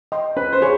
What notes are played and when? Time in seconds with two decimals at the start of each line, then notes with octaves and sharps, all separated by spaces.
0.12 D#5 G5 C6
0.37 C#4 B4
0.53 C5
0.61 F4 G#4 C#5